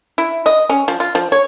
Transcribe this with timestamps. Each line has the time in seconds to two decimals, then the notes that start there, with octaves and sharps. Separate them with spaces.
0.18 E4
0.46 D#5
0.69 C#4
0.88 F3
1.00 F4
1.15 F3
1.32 C#5